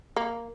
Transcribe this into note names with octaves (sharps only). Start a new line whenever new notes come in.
A#3